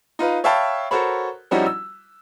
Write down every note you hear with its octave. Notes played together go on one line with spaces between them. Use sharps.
D#4 F4 B4 F5
C#5 E5 F5 G5 A5 B5
F#4 A4 A#4 C5 C#5 B5
F3 G3 C#4 D#4 E4 F#4
E6